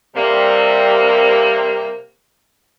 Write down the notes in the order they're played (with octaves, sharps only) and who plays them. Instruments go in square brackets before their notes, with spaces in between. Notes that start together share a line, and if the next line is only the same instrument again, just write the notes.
[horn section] C3 G3 A#3